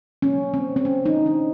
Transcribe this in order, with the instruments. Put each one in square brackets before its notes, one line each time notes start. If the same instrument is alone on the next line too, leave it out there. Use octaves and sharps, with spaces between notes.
[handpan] B2 F#3 A#3 C#4
C4
C4
C#4
D#4
D4